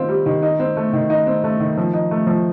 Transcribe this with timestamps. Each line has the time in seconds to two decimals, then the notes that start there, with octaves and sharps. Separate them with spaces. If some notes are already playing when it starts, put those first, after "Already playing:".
Already playing: D#3 C4 F4
0.09 G3
0.26 D#3
0.42 D#4
0.60 C4
0.77 A3
0.93 D#3
1.10 D#4
1.27 C4
1.44 A3
1.60 D#3
1.78 F3
1.93 D#4
2.11 A3
2.27 F3